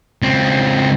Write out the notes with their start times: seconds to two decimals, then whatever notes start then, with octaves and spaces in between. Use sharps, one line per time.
0.22 C#2 C4